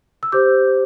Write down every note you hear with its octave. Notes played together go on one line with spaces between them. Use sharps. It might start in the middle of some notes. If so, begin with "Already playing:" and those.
E6
G4 C5 D6 G6